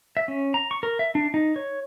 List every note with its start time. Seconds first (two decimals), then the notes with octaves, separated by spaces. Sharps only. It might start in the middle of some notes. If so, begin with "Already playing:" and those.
0.17 E5
0.28 C#4
0.54 A#5
0.71 C#6
0.83 A#4
0.99 E5
1.15 D4
1.34 D#4
1.56 C#5